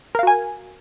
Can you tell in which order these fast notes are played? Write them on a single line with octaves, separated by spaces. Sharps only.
A#4 F5 F#4 G#5